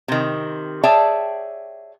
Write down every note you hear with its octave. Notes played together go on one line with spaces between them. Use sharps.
C3 D#3
G#4 C#5 D5 E5 G5 A5